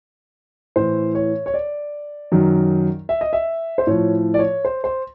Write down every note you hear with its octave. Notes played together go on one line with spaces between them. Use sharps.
A2 E3 C5
C#5
C#5
D5
F#2 D#3 F#3
E5
D#5
E5
C5
A2 F3 C#5
D5
C#5
C5
C5